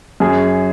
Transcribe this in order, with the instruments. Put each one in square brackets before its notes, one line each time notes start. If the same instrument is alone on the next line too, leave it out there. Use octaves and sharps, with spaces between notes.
[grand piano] F#2 G#4